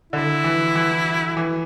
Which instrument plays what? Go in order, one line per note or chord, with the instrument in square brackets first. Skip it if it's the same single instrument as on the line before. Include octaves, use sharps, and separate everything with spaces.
[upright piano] D3 [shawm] E4
[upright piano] E3
E3
E3